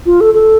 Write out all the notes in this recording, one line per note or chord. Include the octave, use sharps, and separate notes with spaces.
F4
A4
A4